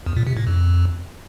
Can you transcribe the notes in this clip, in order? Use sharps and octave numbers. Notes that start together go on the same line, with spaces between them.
E2
A#2
C3
A2
F2